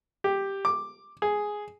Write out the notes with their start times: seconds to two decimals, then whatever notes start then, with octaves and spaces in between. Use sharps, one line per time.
0.24 G4
0.65 D6
1.22 G#4